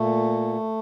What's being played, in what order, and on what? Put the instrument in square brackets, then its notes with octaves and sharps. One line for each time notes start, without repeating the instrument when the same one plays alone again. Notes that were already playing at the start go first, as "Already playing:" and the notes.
Already playing: [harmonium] A#2 A3